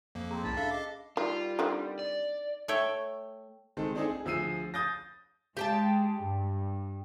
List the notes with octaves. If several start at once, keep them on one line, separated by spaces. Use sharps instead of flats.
F2 F3 A#3
C4 G#4 A#5
C2 A2 C#4 A5 B5
D4 A4 E5 F5
G#4 D#5 F5 D6
D#3 G3 F4
D3 D#3 C4
D5
A3 C#5 E5 G5
D#3 G#3 C4 A4
C4 D4 D#4 G#4 A4
G#4
D2 F3 G#4 E6 C7 D#7
D#6 G6 A6 A#6
G#3 G4 G5 A5
G2